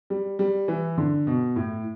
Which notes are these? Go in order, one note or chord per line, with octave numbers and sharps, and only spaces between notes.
G3
G3
E3
D3
B2
A2